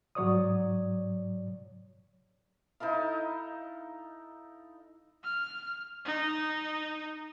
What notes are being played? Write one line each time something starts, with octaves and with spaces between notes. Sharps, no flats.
G#2 F#3 C#5 D5 D#6
D#4 E4 A4 F5
F6
D#4